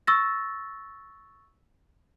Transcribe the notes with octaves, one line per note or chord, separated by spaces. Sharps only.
C#6 E6 A6 A#6